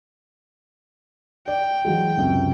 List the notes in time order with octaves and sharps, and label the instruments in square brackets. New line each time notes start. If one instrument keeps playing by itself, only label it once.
[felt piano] D5 [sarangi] G5
[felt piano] E3 F#3 G#3
C#2 F#2 C3